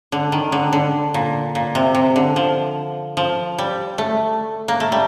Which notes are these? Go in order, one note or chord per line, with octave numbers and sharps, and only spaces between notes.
D3
D#3
D3
D3
A#2
A#2
C3
C3
D3
F3
F3
G3
A3
A#3
A3
G3